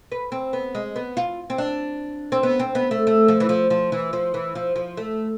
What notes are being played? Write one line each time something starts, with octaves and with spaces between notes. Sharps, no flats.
B4
C4
B3
G#3
B3
F4
C4
D4
C4
B3
C4
B3
A3
A3
F3
E3
F3
F3
E3
F3
E3
F3
F3
A3